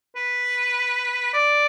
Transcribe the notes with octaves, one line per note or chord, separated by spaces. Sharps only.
B4
D5